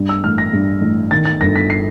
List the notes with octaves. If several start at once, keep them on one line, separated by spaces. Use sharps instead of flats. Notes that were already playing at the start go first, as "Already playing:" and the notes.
Already playing: G2
E6
A1 F6
A#6
G2
A1
D#3 A6
A6
G1 A#6
B6
C7